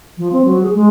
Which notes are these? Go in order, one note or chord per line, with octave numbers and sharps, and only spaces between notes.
F3
C4
F#3
G#4
G#3